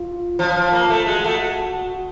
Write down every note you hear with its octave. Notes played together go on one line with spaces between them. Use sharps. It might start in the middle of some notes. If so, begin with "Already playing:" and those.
Already playing: F4
F3 F4
F3
A#3
A3
G#3 F#4
A3